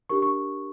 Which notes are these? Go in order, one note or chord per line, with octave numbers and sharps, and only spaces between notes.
D4 G4 A#4 C#6
C#6